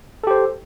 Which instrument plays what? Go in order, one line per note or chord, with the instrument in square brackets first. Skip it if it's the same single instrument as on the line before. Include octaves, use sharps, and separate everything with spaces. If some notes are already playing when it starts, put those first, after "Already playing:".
[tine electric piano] A4
G4
C5